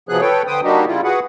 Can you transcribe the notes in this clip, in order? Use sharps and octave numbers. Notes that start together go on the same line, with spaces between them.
C3 F3 F#3 B3 G#4 F#6
A4 B4 C#5 G5
D3 B4 C5 G5 D#6
G3 A#3 D4 D#4 F#4 G4
C#3 G3 E4 F4
F#4 G#4 B4 F#5